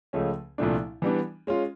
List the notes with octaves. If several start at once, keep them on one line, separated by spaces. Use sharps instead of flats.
C#2 C#3 F3 A3 C#4
C2 A#2 F3 A3 D4
E3 G3 B3 D4
G#3 C#4 F4